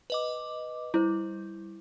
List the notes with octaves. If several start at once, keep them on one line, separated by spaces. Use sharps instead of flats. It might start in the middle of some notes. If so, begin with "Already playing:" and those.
B4 D#5 D6
G3 E4 C5